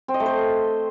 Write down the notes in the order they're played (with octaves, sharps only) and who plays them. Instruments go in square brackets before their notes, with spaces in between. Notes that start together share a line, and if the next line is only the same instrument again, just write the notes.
[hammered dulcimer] C4
D#5
A3
C5